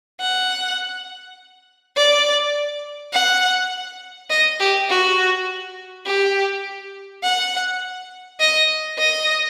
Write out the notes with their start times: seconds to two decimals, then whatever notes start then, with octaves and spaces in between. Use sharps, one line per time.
0.21 F#5
1.97 D5
3.13 F#5
4.30 D#5
4.60 G4
4.90 F#4
6.06 G4
7.24 F#5
8.40 D#5
8.99 D#5